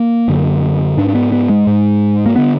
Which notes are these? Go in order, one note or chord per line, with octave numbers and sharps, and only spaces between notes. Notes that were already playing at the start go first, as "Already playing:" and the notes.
Already playing: A#3
F#2 D3
G#2 D4
D4
B3
B3
G#3
G#2
A#3
D3 B3